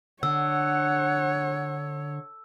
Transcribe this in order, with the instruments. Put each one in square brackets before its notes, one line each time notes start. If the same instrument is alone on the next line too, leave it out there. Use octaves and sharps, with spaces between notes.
[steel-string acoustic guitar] D3 [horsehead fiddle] C#5 [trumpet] F#5 [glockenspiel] E6